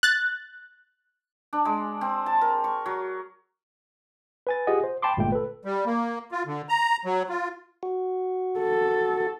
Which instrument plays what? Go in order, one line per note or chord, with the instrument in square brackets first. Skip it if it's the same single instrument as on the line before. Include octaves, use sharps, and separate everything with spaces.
[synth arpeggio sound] F#6 A6
[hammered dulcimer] D4
G#3
C4
A5
A#4
C#6
F#3
[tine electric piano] B4 G#5 A6
F4 G4 G#4 D#5 F#5 G#5
C5
G5 A5 B5 C6 D6
G1 A#2 G#3 A3 F4 G5
A4 B4
[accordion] G3
A#3
F4
D3
A#5
F#3
F4
[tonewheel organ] F#4
[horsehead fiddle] A4